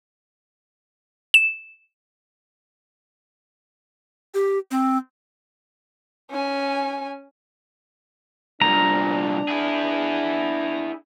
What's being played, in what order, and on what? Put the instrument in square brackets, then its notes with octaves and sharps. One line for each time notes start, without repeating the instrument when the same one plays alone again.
[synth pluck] E7
[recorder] G4
C4
[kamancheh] C#4 G#5
[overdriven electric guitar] C2 A#2 [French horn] D4 [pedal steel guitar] A#5
[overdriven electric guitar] E4 G#4